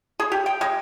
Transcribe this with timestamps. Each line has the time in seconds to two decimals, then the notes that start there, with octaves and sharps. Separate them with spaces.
0.20 G#4
0.32 G4
0.46 G5
0.61 G#3